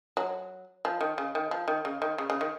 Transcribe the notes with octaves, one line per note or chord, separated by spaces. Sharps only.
F#3
F3
D#3
C#3
D#3
F3
D#3
C#3
D#3
C#3
C#3
D#3